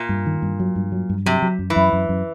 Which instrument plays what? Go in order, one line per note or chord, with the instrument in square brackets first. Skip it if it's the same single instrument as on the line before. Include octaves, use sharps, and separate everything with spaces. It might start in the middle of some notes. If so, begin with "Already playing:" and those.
Already playing: [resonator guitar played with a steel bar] A#2
[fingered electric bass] G2
D#3
G2
F#3
G2
F#3
G2
[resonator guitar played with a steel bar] C3 [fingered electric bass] F#3
[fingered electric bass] F#3
F#2
[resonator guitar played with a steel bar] E3
[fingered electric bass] F#2
F#2
F#2